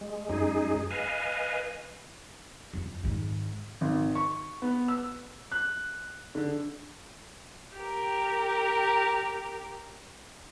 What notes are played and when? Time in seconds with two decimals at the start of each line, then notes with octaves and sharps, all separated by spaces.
0.01 G#3
0.29 F#2 G#3 D#4 G#4
0.91 B4 D#5 F5 G#5
2.73 F2
3.03 G#2 D#3
3.81 G#1
4.15 C#6
4.62 B3
4.88 E6
5.52 F#6
6.35 D3
7.77 G4 A#4